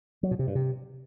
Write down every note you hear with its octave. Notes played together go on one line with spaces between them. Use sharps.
F#3
B2
C3
G2
C3